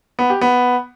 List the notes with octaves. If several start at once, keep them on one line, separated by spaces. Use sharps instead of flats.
B3
G4
B3